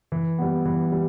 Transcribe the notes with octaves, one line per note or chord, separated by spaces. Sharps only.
E3
G3 B3
E3
G3